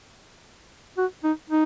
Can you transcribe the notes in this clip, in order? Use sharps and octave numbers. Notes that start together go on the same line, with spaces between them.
F#4
D#4
D#4